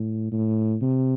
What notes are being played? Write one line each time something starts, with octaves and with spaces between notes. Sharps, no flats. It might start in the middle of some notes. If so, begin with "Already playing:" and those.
Already playing: A2
A2
C3